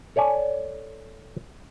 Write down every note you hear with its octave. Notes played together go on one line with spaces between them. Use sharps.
A4 C#5 D5 G#5